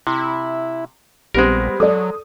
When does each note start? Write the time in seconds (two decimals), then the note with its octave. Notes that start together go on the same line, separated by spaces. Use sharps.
0.07 C3 E4
1.34 A#1 G3 G#3 B3 C4 A#4
1.80 F#3 A4 D5 D#6